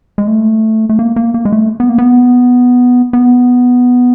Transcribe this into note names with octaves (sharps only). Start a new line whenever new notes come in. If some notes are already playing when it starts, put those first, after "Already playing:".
G#3
A3
A3
A#3
A#3
A#3
G#3
A3
B3
A#3
B3
B3